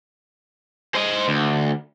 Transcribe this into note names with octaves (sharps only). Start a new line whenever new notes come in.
C5 D#5
D2